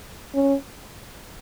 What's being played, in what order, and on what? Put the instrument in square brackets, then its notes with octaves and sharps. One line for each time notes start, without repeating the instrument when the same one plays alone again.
[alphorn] C#4